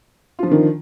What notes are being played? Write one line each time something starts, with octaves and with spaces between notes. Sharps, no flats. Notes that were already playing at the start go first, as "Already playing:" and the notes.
D3 D#3 F3 F4